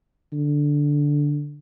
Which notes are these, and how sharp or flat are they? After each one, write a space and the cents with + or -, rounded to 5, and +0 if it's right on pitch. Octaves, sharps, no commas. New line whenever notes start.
D3 -5